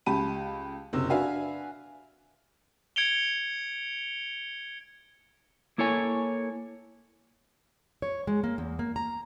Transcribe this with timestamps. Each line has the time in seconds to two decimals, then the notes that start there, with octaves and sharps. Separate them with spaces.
0.06 C#2 G4 A5 B5 D#7
0.93 F#1 C3 E6
1.10 D4 F#4 B4 E5 F5 G#5
2.96 G#6 C#7 D7 F7 G7
5.78 A#3 E4 A4 C#5 G#5
8.02 C#5
8.27 G#3
8.44 A#3
8.58 E2
8.79 A#3
8.96 A#5